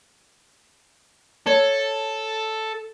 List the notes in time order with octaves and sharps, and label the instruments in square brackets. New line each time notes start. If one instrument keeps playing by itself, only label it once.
[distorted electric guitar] A4 [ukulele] C#5